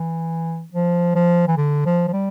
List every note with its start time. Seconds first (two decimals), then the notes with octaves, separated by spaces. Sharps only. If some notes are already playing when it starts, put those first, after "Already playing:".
Already playing: E3
0.73 F3
1.15 F3
1.48 E3
1.57 D3
1.86 F3
2.08 F3
2.13 G3